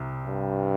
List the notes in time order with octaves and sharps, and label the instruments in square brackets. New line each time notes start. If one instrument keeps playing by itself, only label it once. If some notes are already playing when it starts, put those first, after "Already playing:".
Already playing: [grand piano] C2 C3
[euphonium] G2